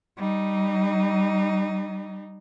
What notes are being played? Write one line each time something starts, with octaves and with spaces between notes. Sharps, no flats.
G3 D#4